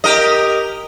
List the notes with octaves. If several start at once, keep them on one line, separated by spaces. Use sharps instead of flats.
G4 A#4 D#5